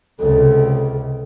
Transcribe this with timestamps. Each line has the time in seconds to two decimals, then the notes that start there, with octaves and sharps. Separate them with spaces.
0.19 C#2 C3 A4